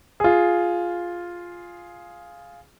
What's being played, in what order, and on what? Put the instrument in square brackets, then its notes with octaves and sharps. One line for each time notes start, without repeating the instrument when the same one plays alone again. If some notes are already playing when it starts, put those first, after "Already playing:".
[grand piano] F4 G#4